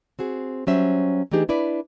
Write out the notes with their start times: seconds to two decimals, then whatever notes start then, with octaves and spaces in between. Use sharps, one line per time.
0.19 C4 F#4 G#4
0.67 F#3 G3 C#4 C5 E5
1.31 E3 A3 D4 D#4 G4 G#4
1.49 D4 E4 B4 D5